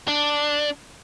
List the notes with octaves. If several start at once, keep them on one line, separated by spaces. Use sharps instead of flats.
D4